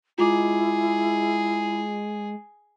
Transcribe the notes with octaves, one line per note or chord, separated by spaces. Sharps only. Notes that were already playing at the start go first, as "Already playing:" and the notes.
G#3 E4 F4 G#4 D6